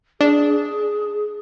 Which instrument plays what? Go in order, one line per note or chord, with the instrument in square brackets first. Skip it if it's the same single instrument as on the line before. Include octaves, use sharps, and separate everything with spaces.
[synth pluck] D4 [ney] G#4